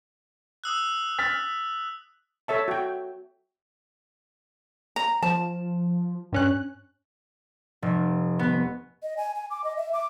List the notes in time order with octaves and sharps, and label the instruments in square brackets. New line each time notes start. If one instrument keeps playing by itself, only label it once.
[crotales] D#6 E6 F#6
[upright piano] F6 A6 B6
[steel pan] A4 C#5 E5 A5
F#4 G5
[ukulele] A#5
[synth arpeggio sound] F3 [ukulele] A5
[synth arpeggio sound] G2 C#4 F#6
[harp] F1
B3
[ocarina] D#5
G#5
G#5
D6
D#5
E5
D6